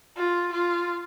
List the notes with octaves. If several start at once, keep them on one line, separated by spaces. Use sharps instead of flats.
F4
F4